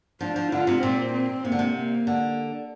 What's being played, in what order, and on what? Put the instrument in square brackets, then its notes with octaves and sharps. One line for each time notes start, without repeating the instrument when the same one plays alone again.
[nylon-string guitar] F3 [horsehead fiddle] D4
[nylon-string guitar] F3
[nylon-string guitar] D3 [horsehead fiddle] F4
[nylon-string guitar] C3
[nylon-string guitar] A#2 [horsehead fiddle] C4
[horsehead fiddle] C4
[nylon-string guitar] C3 [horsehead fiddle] A#3
[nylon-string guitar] D3
C3
[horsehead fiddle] A#3
[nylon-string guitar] D3